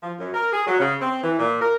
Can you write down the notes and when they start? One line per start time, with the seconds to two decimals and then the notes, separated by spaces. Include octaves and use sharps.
0.03 F3
0.20 F#2
0.34 A#4
0.53 G#4
0.67 F#3
0.79 C#3
1.01 C4
1.24 E3
1.39 A#2
1.62 A#4